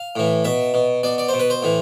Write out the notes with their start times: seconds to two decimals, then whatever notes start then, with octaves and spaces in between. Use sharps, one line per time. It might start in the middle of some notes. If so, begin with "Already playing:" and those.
Already playing: F5
0.16 A2 E3
0.44 B2 E5
0.74 B2
1.03 B2 D5
1.18 D5
1.29 B2 C5
1.39 B4
1.50 C5
1.63 A2 E3